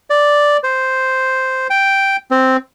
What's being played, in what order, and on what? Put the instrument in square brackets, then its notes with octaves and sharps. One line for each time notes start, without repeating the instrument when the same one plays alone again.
[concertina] D5
C5
G5
C4